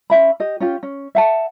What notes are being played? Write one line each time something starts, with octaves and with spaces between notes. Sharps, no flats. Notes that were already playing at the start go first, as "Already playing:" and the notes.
C#4 F#4 E5 B5
G4 D#5
C#4 F4 G4
C#4
E5 F#5 A5